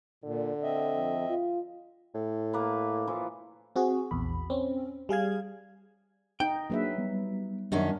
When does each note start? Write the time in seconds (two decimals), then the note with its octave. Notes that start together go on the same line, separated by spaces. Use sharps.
0.24 A#2 D3
0.63 C4 D#5 E5
0.95 F2
1.29 F4
2.14 A2
2.53 A#3 B4
3.07 E3 F3 E4
3.76 C4 F#4 G#4
4.11 A#1 E2 B5
4.50 C4 C#4
5.09 G3 G#4 F5 G#6
6.40 D#4 G5
6.70 F#3 A#3 D4 G#4 B4 E5
6.98 G3 B3
7.72 F#2 D#3 C#4 D4 A#4